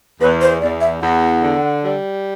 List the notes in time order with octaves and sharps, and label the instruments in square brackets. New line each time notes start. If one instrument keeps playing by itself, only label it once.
[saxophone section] E2 [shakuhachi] B4
[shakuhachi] C5
[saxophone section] E2 [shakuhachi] D5
[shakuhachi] E5
[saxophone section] E2 [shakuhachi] F#5
[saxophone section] D3
G3